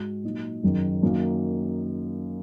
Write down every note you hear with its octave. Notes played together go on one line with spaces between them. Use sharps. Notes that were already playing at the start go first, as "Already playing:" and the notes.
Already playing: G#2 G#3 F#4
A#2 F#3 D#4
F#1 F#2 D#3
F#2 D#3 F#3 A#3